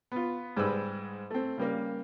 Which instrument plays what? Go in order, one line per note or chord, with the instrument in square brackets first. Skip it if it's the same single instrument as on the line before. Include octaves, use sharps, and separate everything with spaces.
[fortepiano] B3 F4
G#2 G3 G#3 B4 E6
A3 C4
C#3 G3 A#3